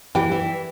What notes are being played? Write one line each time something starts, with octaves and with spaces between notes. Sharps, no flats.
E3 G3 G4
E3